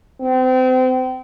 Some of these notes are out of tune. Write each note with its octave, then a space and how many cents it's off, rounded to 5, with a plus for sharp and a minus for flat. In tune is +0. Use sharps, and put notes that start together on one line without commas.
C4 -30